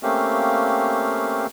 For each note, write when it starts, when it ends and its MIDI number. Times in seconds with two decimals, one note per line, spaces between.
0.03 1.46 57
0.03 1.46 58
0.03 1.46 60
0.03 1.46 61
0.03 1.46 67
0.03 1.46 77